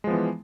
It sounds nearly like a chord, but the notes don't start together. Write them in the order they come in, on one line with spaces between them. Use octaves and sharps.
G#3 F3 B3 E3